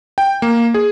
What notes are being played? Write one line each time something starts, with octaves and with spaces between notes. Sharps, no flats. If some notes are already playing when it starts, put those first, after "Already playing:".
G5
A#3
G#4